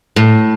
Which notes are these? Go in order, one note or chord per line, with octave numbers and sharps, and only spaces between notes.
A2